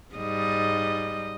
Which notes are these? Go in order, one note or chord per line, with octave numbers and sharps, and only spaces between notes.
G#2 G3 D#5